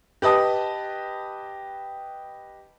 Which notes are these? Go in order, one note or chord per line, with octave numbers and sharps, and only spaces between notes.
G4 B4 D#5 A5 D#6